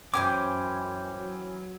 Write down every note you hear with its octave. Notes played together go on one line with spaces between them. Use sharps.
F#2 E3 B3 C#4 C5 G5 D6
F#3